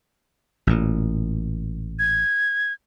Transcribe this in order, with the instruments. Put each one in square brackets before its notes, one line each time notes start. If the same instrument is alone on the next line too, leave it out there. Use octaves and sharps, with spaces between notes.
[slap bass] A1 A#2
[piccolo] G#6